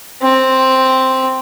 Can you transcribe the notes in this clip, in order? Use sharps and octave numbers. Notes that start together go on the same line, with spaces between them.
C4